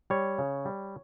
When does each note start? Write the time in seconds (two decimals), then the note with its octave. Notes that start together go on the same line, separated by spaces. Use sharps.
0.10 G3 C#5
0.38 C#3
0.65 G3